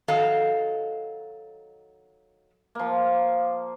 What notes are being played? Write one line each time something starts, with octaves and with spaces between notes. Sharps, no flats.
D#3 F#3 F#4 A4 D#5 F5
F3 A#3